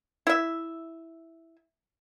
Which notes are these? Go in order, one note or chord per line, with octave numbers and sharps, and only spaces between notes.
E4 E5